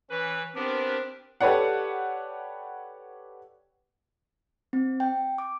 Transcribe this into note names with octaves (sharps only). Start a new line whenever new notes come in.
E3 C#4 B4
B3 C4 D4 G4 A#4
G4 A4 B4 C#5 D5 F#5
C4
G5
D6